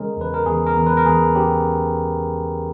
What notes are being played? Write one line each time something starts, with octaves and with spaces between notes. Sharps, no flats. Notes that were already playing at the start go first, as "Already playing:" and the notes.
Already playing: C#3 G#3 C#4 G#4 A#4
E2 B4
A#4
E2 G#4
A#4
E2
B4
A#4
E2 G#4
C#4 G4